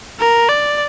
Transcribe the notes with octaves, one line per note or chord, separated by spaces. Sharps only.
A#4
D5